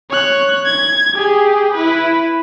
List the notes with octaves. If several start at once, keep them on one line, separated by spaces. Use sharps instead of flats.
C#5 F#6
G#6
G4 G#4
E4 B4